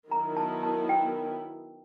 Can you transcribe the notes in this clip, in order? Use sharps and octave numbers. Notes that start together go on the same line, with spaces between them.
D#3 F#3 B3 E4 A#5
A5
A5
G5